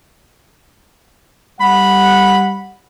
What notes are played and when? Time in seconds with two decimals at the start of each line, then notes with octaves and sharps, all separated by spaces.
1.60 G3 F#5 B5